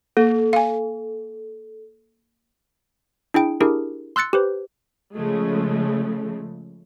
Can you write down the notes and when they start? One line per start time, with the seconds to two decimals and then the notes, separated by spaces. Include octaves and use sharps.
0.17 A#3 A4
0.53 F5 G#5
3.34 D4 E4 G#4 G5 D7
3.61 D4 E4 G4 G#4 A#4
4.16 C6 E6 F#6 A6 C#7
4.33 G4 B4 C5
5.16 C#3 F3 G#3 A3